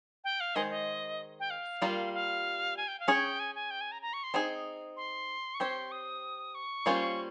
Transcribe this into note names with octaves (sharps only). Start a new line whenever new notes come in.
G5
F5
D#3 G#3 C5 D#5
D#5
G5
F5
G3 A#3 F4 A#4
F5
G#5
G5
F5
C#4 G#4 C#5 G5
G#5
G#5
G5
G#5
A#5
A#5
C#6
C6
C4 D#4 G#4
C6
C#6
C4 G4 C#5 C6
D#6
C#6
G3 A#3 C#4 F4 C5